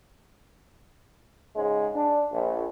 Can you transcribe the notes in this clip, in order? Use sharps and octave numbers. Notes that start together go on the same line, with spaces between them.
G#2 C#3 G#3
D4
A#1